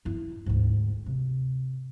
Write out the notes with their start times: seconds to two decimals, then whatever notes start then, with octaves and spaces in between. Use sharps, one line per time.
0.05 G2 E4
0.46 D2 G#2
1.06 C3